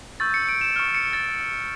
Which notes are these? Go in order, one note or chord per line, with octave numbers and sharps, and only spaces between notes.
C#6 E6 G6 A6
C#7
D7
E7
C#6 F6
C#7
A6